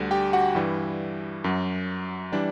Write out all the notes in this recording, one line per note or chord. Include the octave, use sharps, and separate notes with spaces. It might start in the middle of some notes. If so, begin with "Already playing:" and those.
Already playing: D2 D3 G3
G4 G5
F#4 F#5
G2 E3 G3
F#2 F#3
E3 G3 D4 D5